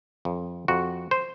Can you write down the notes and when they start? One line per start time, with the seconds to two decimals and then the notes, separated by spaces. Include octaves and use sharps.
0.25 F2
0.68 F2 F#4
1.11 C5